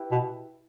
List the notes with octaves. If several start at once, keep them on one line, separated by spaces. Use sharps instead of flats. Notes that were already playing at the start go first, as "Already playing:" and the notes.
Already playing: E4 G4 B4
B2